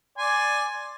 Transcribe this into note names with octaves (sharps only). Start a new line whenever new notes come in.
D5 G#5 C6